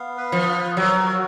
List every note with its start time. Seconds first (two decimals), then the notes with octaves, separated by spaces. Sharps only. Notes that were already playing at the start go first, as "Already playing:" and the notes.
Already playing: B3 F5
0.18 B4
0.32 F3
0.47 F4
0.76 F#3 A#4
1.06 F#4